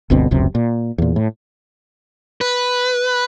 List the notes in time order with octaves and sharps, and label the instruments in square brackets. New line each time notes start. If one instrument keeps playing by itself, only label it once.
[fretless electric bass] G1 D2 B2 C4
F1 C#2 F#2 C3
A#2
E2 A#2
A2
[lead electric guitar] B4